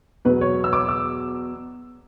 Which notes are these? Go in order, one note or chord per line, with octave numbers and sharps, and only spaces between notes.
E2 B2 F#3 B4
C#5
E6
D6
E6